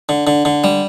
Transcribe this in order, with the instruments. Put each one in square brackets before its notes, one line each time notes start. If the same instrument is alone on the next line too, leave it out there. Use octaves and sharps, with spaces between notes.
[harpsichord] D3
D3
D3
G3